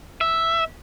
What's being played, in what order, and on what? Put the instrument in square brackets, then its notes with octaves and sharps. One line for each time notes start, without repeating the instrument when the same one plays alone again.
[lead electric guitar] E5